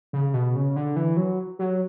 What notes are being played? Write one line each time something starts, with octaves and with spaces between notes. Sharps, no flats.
C#3
B2
C#3
D3
E3
F#3
F#3